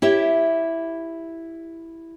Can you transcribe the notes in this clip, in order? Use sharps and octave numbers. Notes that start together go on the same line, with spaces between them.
E4 G4 C#5 E5